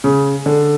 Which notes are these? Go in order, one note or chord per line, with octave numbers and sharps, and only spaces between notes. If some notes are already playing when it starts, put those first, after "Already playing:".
C#3
D3